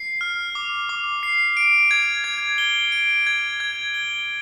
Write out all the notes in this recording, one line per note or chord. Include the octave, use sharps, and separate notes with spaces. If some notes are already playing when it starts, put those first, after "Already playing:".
Already playing: C7
F6
D6
D6
C7
D7
G#6
G#6
G7
D7
G#6
G#6
G7